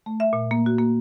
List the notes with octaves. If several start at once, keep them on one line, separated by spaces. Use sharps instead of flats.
A3
E5
A#2
A#3
F#4
A#3